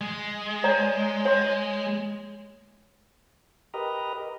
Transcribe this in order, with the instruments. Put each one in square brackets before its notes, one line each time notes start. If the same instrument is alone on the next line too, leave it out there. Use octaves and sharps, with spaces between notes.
[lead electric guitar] G#3
[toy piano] C#5 D5 A#5
C#5
C#5 C6
[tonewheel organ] G4 A#4 B4 D#5 A#5